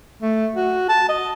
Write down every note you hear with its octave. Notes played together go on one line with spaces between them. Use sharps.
A3
F#4
A5
D#5